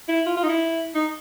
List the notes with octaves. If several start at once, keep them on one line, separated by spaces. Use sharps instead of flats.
E4
F4
F4
D#4
E4
D#4